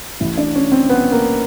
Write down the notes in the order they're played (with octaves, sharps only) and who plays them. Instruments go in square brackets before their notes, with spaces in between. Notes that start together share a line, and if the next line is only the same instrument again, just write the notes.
[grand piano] A1 A2 E3 E4
D4
C#4
C4
B3
A#3